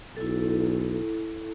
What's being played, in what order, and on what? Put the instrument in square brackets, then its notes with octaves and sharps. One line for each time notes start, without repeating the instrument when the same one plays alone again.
[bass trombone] B1 [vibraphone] E4 A4